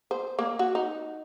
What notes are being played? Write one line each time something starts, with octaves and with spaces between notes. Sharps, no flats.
C5
A#3
F#4
D#4